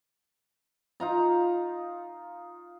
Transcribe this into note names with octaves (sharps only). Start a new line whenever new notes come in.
D#4 F4 A#5